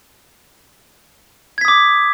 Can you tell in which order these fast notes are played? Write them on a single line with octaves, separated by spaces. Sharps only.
G#6 B6 D#6 D6